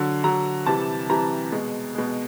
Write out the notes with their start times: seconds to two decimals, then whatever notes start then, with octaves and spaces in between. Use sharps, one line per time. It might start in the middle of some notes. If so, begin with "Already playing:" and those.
Already playing: D3 F#3
0.24 D3 F#3 A#5
0.66 C3 E3 G3 A5
1.09 C3 E3 G3 A#5
1.52 B2 G#3
1.95 B2 G#3